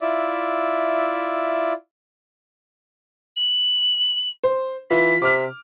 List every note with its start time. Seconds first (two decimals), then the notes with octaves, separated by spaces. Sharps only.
0.01 E4 F4 D5 E5
3.36 F#7
4.43 C5
4.90 E3 F4 B6
5.22 C3 D6 F6